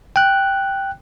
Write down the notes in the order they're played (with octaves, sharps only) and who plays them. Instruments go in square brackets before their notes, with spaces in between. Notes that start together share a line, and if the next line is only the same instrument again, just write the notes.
[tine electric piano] G5 F#6